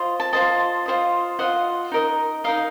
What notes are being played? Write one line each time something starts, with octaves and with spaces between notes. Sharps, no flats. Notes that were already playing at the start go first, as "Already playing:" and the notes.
Already playing: F4 C5 D#5
A5
F4 C5 D#5 A5
F4 C5 D#5
F4 C5 D#5 F#5
D#4 A#4 D#5
D#4 A#4 D#5 F5